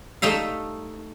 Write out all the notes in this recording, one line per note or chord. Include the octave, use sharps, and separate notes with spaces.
A3 D#4 E5 F5